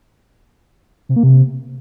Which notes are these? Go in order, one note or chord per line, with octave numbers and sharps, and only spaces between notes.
C3
A#3
C3